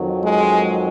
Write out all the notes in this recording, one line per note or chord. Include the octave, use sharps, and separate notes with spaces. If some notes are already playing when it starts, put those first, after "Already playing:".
Already playing: F2 D#3 F#3
G#3